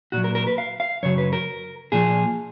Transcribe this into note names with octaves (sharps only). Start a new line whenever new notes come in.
A#2 F#3 F#4
A#4
A#4
B4
F5
F5
F#2 C#3 F#3 C#5
B4
A#4
A#2 F3 G#4